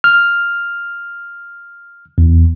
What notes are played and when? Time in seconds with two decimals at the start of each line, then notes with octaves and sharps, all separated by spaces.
0.04 F6
2.18 E2